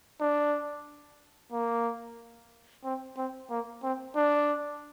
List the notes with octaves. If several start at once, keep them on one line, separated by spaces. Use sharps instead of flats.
D4
A#3
C4
C4
A#3
C4
D4